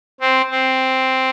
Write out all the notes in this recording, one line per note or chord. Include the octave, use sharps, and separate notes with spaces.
C4
C4